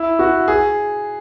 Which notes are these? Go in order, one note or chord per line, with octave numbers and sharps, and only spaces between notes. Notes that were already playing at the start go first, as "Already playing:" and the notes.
Already playing: E4
F#4
G#4